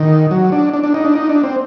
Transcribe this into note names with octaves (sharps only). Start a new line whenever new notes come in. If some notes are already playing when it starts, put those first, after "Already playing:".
Already playing: D#3
F#3
D4
D4
D4
D#4
D4
D#4
D4
C4